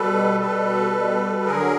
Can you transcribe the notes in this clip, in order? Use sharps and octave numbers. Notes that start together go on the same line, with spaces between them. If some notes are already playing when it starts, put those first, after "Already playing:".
Already playing: B2 G3 A4 B4
B2 G3 A4 B4
B2 G3
D3 F#3 G#4 A#4